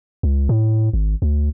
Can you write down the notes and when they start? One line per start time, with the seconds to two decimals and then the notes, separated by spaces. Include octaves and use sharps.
0.23 C#2
0.49 A2
0.93 G#1
1.22 D2